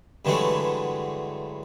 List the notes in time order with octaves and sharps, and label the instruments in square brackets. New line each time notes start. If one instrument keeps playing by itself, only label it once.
[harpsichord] G2 D3 E3 F#3 G#3 A3